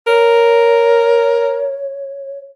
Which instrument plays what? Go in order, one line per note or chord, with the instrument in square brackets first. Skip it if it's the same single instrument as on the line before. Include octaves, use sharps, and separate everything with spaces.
[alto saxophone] A#4 [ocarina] C#5